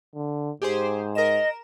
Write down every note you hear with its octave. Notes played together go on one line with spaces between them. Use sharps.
D3
G#2 G4 G#4 C5
A#4 D#5 E7